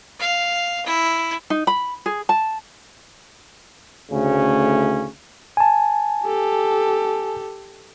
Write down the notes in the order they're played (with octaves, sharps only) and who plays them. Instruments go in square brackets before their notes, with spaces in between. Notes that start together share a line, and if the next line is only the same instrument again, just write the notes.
[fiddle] F5
E4
[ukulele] D#4
B5
G#4
A5
[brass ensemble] D2 A2 C#3 A3 C#4
[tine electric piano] G#5 A5
[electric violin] G4 A4